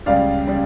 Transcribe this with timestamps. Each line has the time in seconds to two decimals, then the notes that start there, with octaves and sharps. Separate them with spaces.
0.06 C#2 C#3 G3 D5 F5
0.48 C#3 G3